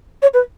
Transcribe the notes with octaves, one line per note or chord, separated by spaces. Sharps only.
C#5
B4